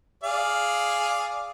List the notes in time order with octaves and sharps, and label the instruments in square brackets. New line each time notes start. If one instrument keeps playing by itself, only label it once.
[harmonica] G#4 D5 F5